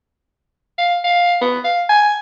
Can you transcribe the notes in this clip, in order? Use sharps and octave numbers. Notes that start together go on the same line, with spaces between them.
F5
F5
B3
F5
G#5